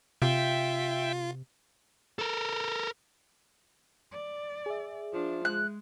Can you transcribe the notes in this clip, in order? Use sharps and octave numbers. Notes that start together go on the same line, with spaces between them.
C3 F4 E5 G5
A4 A#4
D5
G#4 E5
F3 D4
G#3 F#6